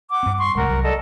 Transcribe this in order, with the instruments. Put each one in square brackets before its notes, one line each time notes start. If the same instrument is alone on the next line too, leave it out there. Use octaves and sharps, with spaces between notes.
[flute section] F#5 D6
[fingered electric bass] G2 C4
[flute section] C6 C#6
[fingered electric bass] D1 C2 G#3 [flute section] A#4 F#5
[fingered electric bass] C2 F#3
[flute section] A4 D5 D#5